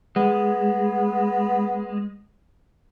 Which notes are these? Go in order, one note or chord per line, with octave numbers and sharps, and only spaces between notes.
G#3 B3